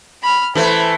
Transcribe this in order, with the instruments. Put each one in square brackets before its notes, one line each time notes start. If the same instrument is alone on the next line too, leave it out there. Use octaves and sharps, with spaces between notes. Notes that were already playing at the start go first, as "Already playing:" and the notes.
[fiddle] B5 F6
[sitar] E3 A3 [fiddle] C5 B5